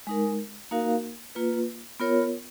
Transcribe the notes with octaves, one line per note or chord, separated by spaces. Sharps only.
G#3 D#4 A#4
A#3 D#4 F#4 A#4 F5
A#3 F4 B4
B3 F4 A#4 C#5